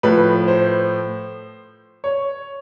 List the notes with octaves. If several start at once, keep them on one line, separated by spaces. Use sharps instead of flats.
A2 F3 B4
C5
C#5